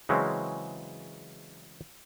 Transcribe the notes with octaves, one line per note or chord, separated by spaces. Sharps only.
C#3 E3 F#3 G#3 C4 C#4